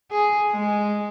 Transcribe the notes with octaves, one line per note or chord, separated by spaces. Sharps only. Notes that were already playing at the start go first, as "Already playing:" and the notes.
G#4
G#3